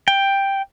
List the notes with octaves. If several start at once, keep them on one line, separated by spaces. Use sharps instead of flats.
G5